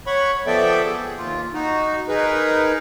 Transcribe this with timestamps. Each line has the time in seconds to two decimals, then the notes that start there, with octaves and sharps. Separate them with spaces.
0.06 C#5 F#5 B5 C#6
0.47 F3 B3 A4 D5 E5 G5
0.85 G#4
1.18 D#2 F4
1.53 D#4 F#4
2.08 D#4 G#4 A#4 B4